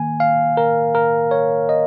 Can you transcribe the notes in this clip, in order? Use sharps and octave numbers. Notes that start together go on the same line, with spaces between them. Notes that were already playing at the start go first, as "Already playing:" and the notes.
Already playing: D#3 A#3 G#5
F5
A#4
A#4
C#5
D#5